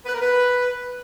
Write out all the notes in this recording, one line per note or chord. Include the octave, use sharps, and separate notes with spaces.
B4
A#4
B4